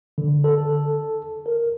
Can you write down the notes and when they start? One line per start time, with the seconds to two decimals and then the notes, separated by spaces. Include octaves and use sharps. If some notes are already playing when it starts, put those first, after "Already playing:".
0.18 D3
0.44 A4
1.46 A#4